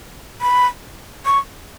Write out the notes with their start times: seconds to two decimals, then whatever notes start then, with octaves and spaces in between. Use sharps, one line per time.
0.41 B5
1.26 C#6